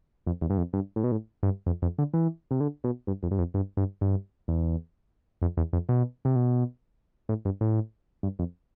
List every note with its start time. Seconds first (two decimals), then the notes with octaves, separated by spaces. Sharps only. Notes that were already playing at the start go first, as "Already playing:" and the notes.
0.26 F2
0.41 E2
0.50 G2
0.58 F2
0.73 G2
0.96 A2
1.04 B2
1.12 A2
1.43 G2
1.66 F2
1.82 F2
1.98 D3
2.14 E3
2.51 C3
2.60 D3
2.84 B2
3.07 G2
3.23 F2
3.31 G2
3.38 F2
3.54 G2
3.77 G2
4.01 G2
4.48 E2
5.42 F2
5.57 E2
5.73 F2
5.89 B2
6.25 C3
6.36 B2
7.29 A2
7.45 G2
7.61 A2
8.23 G2
8.39 F2